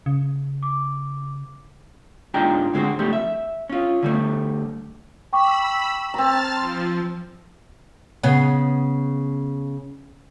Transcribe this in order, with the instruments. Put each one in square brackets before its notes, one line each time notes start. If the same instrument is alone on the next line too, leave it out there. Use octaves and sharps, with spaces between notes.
[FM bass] C#3
[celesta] D6
[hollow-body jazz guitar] G#2 D4 F4 D#5 G5 A#5
D3 G#3 C4 F#4
G2 C3 F3 G3 A3
E5
C#4 F4
D3 G3 A3
[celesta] G5 C#6 D6 [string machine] B5 E6
[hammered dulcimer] C4 A#5 [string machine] A5 F6 A6
[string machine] F3 [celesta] C6
[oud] C#3 B3